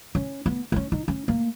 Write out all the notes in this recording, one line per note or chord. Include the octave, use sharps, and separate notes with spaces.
C#4
B3
B3
C#4
D#4
C#4
A#3